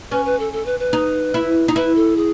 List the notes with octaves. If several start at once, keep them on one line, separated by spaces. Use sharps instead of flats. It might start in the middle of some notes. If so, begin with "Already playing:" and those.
C#4 B4
B4
A4
A4
B4
B4
D#4
E4
D#4
E4 B4
A4
G#4